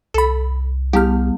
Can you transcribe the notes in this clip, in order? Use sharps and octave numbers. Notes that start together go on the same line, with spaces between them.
C2 A4 B5
G3 B3 G4 F6